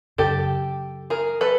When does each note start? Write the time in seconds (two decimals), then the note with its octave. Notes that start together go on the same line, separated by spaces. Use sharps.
0.18 F#2 C#3 F#3 G4 A4
1.10 G#4 A#4
1.41 A4 B4